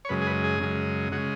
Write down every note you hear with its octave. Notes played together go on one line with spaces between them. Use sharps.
C#5
F#2 C#3 G#3 B4
G#4
B4
G#4
F#2 C#3 G#3
C#3 G#3 F#4